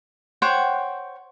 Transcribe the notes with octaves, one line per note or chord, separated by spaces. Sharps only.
C5 C#5 F#5 G5